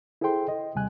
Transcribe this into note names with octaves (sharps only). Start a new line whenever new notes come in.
E4 G#4 A4 C5 G5 C6
D#5
D#2 C3 G3 G#5 F#6